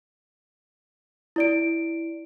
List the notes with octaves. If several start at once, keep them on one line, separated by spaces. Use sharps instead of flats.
E4 D5 D7